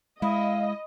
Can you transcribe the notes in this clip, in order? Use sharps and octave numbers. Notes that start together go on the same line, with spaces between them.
G#3 E4 D#5 F5